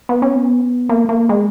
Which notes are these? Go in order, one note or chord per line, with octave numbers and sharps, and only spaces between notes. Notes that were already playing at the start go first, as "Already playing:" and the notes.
B3
C#4
B3
A#3
A#3
G#3